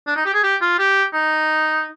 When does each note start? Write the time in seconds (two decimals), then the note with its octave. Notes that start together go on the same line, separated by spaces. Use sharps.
0.07 D4
0.16 D#4
0.26 G4
0.34 G#4
0.44 G4
0.61 F4
0.79 G4
1.14 D#4